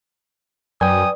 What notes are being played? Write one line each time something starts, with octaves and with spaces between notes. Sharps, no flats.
F#2 B4 D5 G5 G#5 D#6